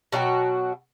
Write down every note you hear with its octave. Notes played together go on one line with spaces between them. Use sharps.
B2 F#3 F#4 G5